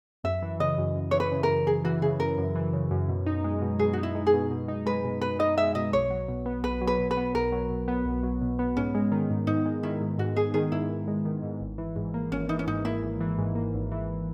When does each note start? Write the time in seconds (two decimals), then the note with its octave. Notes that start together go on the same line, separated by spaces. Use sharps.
0.24 F#2 E5
0.42 E3
0.60 C#3 D#5
0.78 F#2
0.96 F#2
1.11 E3 C#5
1.20 B4
1.32 C#3
1.43 A#4
1.49 F#2
1.67 F#2 G#4
1.85 E3 F#4
2.02 C#3 G#4
2.20 F#2 A#4
2.38 F#2
2.55 E3
2.73 C#3
2.91 F#2
3.09 B2
3.27 D#4
3.44 G#3
3.62 B2
3.79 B2 G#4
3.93 D#4 F#4
4.03 E4
4.15 G#3
4.27 G#4
4.33 B2
4.51 B2
4.68 D#4
4.86 G#3 B4
5.04 B2
5.21 B2 B4
5.39 D#4 D#5
5.57 G#3 E5
5.75 B2 D#5
5.93 B1 C#5
6.10 F#3
6.28 B2
6.46 B3
6.64 B1 B4
6.81 F#3
6.87 B4
6.99 B2
7.11 B4
7.17 B3
7.35 B1 A#4
7.52 F#3
7.70 B2
7.88 B3
8.05 B1
8.23 F#3
8.41 B2
8.59 B3
8.77 G#2 C#4
8.95 G#3
9.12 D#3
9.30 G#2
9.47 G#2 D#4
9.66 G#3
9.83 D#3 E4
10.01 G#2
10.18 G#2 F#4
10.36 G#3 G#4
10.54 D#3 G#4
10.72 G#2 E4
10.90 G#2
11.08 G#3
11.25 D#3
11.43 G#2
11.61 G#1
11.78 E3
11.96 G#2
12.14 A#3
12.32 G#1 C#4
12.49 E3 D#4
12.59 C#4
12.67 G#2 D#4
12.85 A#3 E4
13.03 G#1
13.20 E3
13.38 G#2
13.55 A#3
13.74 G#1
13.92 E3